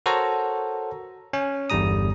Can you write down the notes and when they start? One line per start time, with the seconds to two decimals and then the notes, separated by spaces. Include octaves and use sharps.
0.06 F#4 A4 A#4 C5 C#5 A#5
1.33 C#4 G#5
1.70 G1 E2 D3 G3 A#5 D#6